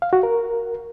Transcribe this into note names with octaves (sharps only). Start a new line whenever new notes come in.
F5
F#4
A#4